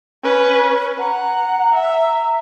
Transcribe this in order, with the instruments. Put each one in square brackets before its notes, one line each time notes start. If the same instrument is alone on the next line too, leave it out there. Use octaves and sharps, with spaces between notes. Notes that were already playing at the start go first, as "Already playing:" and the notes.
[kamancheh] C#4 B4
[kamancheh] F#5 [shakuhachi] A#5
[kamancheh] E5